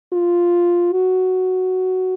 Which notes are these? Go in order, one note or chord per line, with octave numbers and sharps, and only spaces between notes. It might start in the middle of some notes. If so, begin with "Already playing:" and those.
F4
F#4